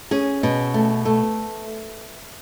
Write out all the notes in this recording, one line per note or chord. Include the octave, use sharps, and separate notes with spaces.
C#4 G#4
B2
A3
A3